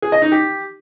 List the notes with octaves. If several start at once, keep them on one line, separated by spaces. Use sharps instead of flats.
G#4
D#5
D#4
G4